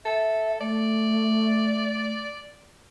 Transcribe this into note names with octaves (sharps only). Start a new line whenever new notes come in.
A4 E5
A3 D5